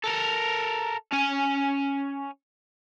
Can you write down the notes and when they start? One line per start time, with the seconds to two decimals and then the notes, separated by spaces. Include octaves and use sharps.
0.04 A4 A#4
1.12 C#4 G#5